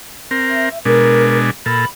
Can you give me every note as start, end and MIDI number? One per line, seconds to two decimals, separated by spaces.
0.31 0.69 60
0.31 0.69 70
0.50 0.76 76
0.85 1.51 47
0.85 1.51 56
0.85 1.51 62
0.85 1.39 70
1.66 1.85 46
1.66 1.85 69
1.66 1.87 83